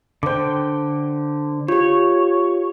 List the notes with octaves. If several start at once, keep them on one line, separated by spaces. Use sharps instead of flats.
D3 C5 G5 D6
F4 G4 C#5